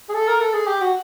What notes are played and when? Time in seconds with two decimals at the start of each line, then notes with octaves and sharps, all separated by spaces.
0.09 G#4
0.14 A4
0.28 A#4
0.40 A4
0.54 G#4
0.67 G4
0.81 F#4